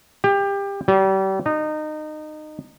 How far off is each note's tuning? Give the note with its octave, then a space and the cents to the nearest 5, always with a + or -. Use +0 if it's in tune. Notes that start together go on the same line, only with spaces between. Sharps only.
G4 +25
G3 -35
D#4 -25